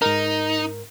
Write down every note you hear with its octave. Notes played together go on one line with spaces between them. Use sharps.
G#2 D#4 A#4